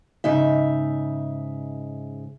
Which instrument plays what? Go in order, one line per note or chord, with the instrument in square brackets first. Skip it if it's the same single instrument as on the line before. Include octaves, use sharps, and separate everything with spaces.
[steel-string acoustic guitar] G#2 C#3 D#4 E5